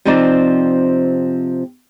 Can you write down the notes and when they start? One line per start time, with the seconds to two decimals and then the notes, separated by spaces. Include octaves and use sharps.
0.05 C3 F3 C4 D#4 D5